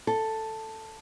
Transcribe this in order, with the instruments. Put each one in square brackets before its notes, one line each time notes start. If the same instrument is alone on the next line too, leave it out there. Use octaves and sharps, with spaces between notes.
[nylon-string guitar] A4